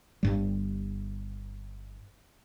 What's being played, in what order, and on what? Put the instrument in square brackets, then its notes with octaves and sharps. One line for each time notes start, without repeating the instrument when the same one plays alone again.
[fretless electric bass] G1 G2 G3